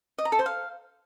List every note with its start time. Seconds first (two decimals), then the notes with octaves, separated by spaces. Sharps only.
0.18 D#5
0.25 A#5
0.32 A4
0.39 C5
0.46 F5